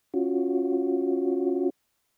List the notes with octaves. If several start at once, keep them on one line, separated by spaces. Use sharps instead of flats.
C#4 F4 F#4